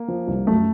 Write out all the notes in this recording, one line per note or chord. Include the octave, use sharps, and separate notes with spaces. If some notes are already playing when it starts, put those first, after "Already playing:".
Already playing: A#3
F3
C2
F#2 A3